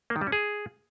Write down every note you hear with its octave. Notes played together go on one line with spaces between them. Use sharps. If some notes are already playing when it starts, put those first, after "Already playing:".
A#3
D#3
G3
C#4
G#4